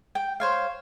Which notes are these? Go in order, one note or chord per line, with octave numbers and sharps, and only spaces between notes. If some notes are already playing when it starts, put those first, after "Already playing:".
G5
C5 C#5 F5